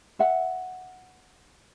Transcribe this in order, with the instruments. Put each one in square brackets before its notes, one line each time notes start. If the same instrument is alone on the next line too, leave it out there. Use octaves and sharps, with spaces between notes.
[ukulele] E5 F#5